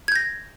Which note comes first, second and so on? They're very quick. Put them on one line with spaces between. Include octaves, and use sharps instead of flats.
G#6 G6 A#6